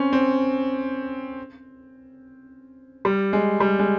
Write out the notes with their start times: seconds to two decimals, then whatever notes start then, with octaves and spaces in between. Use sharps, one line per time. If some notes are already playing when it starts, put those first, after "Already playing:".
Already playing: C4 C#4
0.13 C4
3.05 G3
3.33 G#3
3.60 G3
3.79 G#3